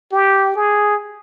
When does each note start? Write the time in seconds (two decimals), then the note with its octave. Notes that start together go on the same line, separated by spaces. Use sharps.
0.12 G4
0.56 G#4